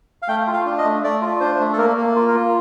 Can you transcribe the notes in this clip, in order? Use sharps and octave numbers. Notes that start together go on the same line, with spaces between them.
F5
A3 G5
F4
F5
D4
D#5
A3
A3 D5
F4
D4 C5
A3
A4
A#3 A#4
A#3
F4
A#4
F4